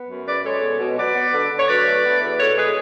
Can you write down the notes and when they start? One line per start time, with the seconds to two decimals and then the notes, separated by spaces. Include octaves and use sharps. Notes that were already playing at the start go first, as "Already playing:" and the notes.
Already playing: B3
0.09 F#2
0.26 C#3 B4 D5
0.44 G#3 A4 C#5
0.63 B2
0.80 B2
0.97 F#3 B4 D5
1.16 B3
1.33 D3
1.51 D3
1.57 C#5
1.68 F#3 B4 D5
1.86 A3
2.04 B3
2.21 E2
2.39 B2 A4 C#5
2.57 G#3 G#4 B4